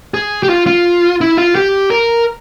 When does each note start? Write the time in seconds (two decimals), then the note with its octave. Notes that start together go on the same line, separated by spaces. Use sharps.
0.14 G#4
0.43 G4
0.49 F4
0.67 F4
1.21 E4
1.38 F4
1.55 G4
1.90 A#4